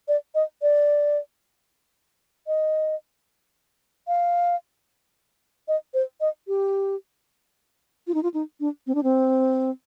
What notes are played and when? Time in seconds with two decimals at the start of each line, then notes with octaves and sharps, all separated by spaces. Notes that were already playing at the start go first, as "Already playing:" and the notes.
0.08 D5
0.35 D#5
0.62 D5
2.47 D#5
4.08 F5
5.68 D#5
5.94 C5
6.21 D#5
6.48 G4
8.07 F4
8.14 D#4
8.23 F4
8.34 D#4
8.60 D4
8.87 C4
8.95 D4
9.03 C4